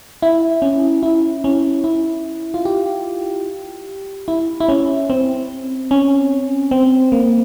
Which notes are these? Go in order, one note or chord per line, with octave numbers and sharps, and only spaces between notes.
E4
C#4
E4
C#4
E4
F4
G4
E4
E4
C#4
C4
C#4
C4
A#3